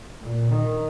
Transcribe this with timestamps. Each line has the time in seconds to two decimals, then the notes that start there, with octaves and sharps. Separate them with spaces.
0.21 A#2
0.51 D#3